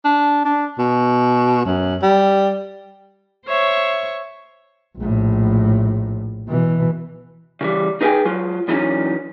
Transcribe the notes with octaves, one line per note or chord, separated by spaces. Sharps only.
D4
D4
B2
F#2
G3
C5 C#5 E5 C#6
A#1 A2
B2 E3
C#3 E3 G3
D#4 G#4 B4 E5 G5 G#5
F#3 F4
F#2 E3 F#3 C4 C#4 D#4